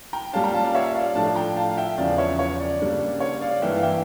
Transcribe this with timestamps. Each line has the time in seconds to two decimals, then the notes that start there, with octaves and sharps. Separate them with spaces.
0.13 G5 A#5
0.33 A#2 G3 C#4 F5 A5
0.44 G5 A#5
0.54 F5 A5
0.64 D5 F5
0.75 C#5 E5
0.95 D5 F5
1.15 A2 F3 A3 D4 F5 A5
1.36 G5 A#5
1.56 F5 A5
1.70 F5
1.77 E5 G5
1.98 E2 C#3 F3 C#4 D5 F5
2.18 C#5 E5
2.39 C#5
2.60 D5
2.79 C#3 G3 A#3 D4
3.20 C#5
3.41 D5 F5
3.62 G2 E3 A#3 E5 G5
3.76 F5
3.83 E5 G5